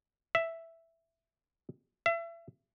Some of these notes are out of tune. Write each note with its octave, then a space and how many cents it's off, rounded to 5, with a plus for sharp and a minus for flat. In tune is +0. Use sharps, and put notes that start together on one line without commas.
E5 +5
E5 +35